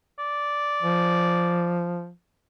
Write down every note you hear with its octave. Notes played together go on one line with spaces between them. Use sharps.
D5
F3